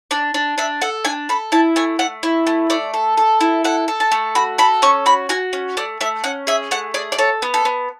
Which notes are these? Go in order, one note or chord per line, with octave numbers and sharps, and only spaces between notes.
D4 D5
D4
D4 E5
A4 F#5
D4 G#5
A4 B5
E4 A5
A3 G#5
A3 F#5
E4
A3
A3 D5
A4
A4
E4
A4 F#5
A4
A5
A3
F#4 B5
A4 B5
C#4 C#6
F#4 B5
F#4 G#5
C#4
A3 D5
A3 E5
C#4 F#5
G#4 E5
A3 F#5
G#4 D5
D5
A4 C#5
B3
A4
B3